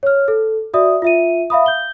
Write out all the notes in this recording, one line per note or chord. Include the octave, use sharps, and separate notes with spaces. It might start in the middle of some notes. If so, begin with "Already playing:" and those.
C#5 F6
A4
F#4 D5 E5 D#6
F4 E5 D#7
E5 F5 B5 D#6
G6 G7